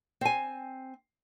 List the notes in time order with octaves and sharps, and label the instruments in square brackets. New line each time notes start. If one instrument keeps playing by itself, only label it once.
[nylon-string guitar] C4 G#5